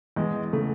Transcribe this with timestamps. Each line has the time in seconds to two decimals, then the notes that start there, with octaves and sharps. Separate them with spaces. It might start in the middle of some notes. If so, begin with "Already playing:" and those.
0.16 E2 G#3
0.53 C#3 A3